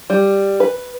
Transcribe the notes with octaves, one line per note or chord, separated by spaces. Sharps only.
G3
B4